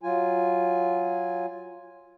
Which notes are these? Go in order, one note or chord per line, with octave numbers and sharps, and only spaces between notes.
F#3 F4 G#5